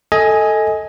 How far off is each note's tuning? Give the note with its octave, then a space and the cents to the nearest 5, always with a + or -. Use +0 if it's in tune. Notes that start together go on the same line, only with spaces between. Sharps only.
A4 +0 D#5 +20 G#5 +0